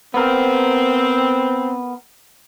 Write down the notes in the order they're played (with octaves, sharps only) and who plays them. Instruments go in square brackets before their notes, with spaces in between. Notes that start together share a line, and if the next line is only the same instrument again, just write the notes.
[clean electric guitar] B3 A#4 [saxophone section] C4